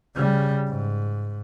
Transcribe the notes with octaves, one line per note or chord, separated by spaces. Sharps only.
C#3 G3
G#2